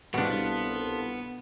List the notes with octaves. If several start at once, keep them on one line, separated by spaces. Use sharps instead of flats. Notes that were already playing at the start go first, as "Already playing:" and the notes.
C2 B2 B3 D4 F4 A4 F5